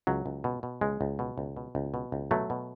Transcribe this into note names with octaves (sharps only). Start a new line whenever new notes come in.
C#2 F#3
C#2
B2
B2
C#2 G#3
C#2
B2
C#2
B2
C#2
B2
C#2
B2 F#3 A3
B2